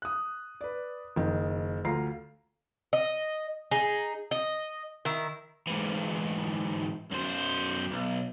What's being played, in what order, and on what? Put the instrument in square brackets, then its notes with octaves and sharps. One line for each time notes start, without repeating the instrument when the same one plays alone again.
[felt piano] D#6 F#6
B4 D5
F#1 D#3
D2 F4 A#5 C7
[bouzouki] D#5
D#4 G#4
D#5
D#3 E4
[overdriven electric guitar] G#2 E3
F#2 C5
B1